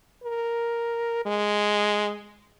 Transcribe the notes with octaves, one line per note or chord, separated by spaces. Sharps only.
A#4
G#3